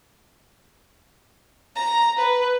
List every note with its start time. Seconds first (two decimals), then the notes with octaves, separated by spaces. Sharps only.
1.76 A#5
2.17 B4